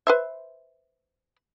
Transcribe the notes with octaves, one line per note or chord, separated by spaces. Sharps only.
B4 C5 E5